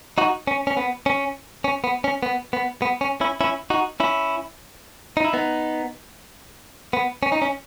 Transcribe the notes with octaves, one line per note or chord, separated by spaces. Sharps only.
D#4 F#4
C#4
C#4
B3
C#4
C#4
B3
C#4
B3
B3
B3
C#4
C#4 E4
C#4 E4
D#4 F#4
C#4 E4
D#4
E4
B3 D#4
B3
C#4
D#4
C#4